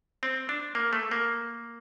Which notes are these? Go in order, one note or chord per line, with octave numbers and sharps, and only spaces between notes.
C4
D4
A#3
A3
A#3